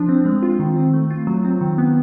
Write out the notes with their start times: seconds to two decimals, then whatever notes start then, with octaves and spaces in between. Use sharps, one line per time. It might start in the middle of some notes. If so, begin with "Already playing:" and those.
Already playing: F3 D4
0.09 C4
0.26 G#3
0.43 F4
0.60 D#3
0.76 C4
0.93 A3
1.11 F4
1.27 F#3
1.45 C4
1.61 D#3
1.78 B3